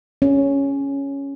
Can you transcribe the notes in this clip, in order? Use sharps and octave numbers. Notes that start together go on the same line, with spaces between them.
C#4